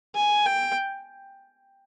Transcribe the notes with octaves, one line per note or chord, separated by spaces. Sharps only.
G#5
G5